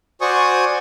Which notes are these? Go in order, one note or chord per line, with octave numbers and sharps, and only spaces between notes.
F#4 C5 D5 G#5 C#6 D#6